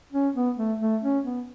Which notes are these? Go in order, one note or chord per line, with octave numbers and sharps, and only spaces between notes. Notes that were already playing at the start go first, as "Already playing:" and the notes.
C#4
B3
A3
A3
C#4
B3